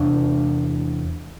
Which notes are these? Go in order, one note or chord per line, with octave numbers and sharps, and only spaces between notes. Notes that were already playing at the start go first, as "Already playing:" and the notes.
Already playing: E2 C3 D4